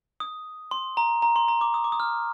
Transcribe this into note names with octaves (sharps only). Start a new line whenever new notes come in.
D#6
C6
A#5
A#5
C6
A#5
D6
D#6
D6
D#6
F6